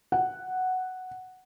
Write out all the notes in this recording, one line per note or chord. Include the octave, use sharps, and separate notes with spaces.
F#5